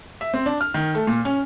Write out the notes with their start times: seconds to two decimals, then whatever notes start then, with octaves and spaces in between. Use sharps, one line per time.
0.21 E5
0.34 C4
0.46 D4
0.61 F6
0.74 D#3
0.95 A3
1.07 A#2
1.25 C#4